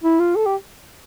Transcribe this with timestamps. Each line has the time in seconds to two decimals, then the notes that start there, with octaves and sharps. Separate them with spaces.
0.04 E4
0.20 F4
0.36 A4
0.46 G4